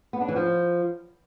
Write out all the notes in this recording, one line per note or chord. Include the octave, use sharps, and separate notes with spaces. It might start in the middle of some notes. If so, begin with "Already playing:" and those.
B3
D4
E3
F3